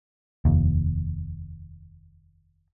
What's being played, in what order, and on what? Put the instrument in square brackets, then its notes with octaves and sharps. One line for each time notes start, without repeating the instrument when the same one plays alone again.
[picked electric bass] F1 D#2